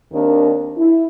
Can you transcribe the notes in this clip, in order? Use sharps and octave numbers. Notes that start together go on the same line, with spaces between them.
D#2 D#3 C4 D4 A#4
E4